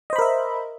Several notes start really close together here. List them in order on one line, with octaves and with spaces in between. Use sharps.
D#5 C5 B5 A#4 E5